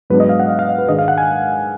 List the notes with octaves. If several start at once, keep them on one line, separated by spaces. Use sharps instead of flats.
G#2 F#3 B3 D4 B4
D#5
F5
F#5
F5
F5
D#5
B4
G#2 D#3 G#3 D4 D#5
F5
F#5
G#5